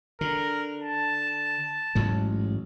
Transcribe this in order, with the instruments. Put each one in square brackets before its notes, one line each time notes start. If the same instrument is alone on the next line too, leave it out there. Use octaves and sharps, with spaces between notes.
[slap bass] D3 [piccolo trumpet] A#4
[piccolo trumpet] A5
[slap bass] A1 G#2 F#3